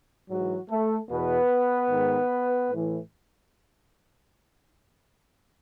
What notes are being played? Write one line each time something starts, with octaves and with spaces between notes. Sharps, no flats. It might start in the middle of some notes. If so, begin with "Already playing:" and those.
G#2 E3 F#3 F#4
A3 A4
E2 B2 B3 B4
G#2 D#3
A2 E3